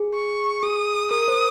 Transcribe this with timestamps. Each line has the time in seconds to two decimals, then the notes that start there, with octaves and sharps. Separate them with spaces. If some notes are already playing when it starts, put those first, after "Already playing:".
Already playing: G#4
0.14 C#6
0.63 G#4 D#6
1.11 A#4 D#6
1.28 C5